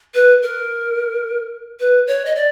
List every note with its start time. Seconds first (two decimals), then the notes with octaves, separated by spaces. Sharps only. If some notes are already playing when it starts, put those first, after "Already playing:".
0.14 B4
0.43 A#4
1.80 B4
2.07 C#5
2.25 D#5
2.35 D5